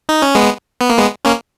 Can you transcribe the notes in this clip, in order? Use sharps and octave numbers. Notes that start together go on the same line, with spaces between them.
D#4
C#4
G#3 B3
B3
A#3
G#3 B3
A#3 C#4